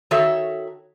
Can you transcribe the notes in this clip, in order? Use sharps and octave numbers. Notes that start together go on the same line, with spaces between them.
D#3 F#4 A4 C#5 E5